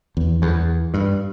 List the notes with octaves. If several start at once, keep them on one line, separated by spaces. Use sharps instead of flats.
E2
E2
G2